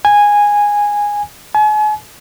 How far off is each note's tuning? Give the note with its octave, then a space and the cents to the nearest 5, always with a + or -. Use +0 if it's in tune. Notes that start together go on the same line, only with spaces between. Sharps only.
G#5 -10
G#5 +40